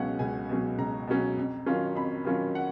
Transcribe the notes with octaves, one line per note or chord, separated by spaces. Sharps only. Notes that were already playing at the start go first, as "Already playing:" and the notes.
Already playing: C#2 B2 F#3 C#4 D#5 F5 F#5
C#2 G#5
B2 F#3 C#4
C#2 A#5
B2 F#3 C#4
F2
D#3 F#3 C#4 F4
F2 B5
D#3 F#3 C#4 F4
F#5